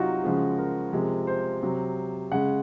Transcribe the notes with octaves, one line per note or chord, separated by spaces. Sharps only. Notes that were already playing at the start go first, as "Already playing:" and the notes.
Already playing: C3 F#3 D#4 F4 F#4
C#3 F3 G#3
A#4
C3 F3 G#3
C5
C3 F#3
C#3 G#3 F#5